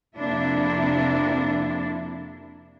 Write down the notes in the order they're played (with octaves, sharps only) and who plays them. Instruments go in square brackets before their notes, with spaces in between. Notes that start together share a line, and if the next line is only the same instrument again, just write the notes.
[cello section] F2 C3 A#3 D4 E4